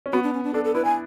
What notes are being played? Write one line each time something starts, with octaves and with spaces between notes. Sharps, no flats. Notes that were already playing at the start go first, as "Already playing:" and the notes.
C#4
B3 F#4
D4
C#4
D4
D4 A4
A4
E4 B4
G#5